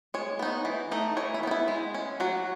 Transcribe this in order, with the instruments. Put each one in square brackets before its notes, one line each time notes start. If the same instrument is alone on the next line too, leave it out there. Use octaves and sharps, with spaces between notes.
[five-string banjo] G#3 C#5
B3 D#4
E3
A3 D#4
E3 C#5
E4
B3 D#4
E4
G#3
C#4
F#3 F#4